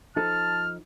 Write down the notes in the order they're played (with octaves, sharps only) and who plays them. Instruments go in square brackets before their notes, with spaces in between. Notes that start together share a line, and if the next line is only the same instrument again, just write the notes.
[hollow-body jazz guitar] F3 D#4 A4 [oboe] A5 [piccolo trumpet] F6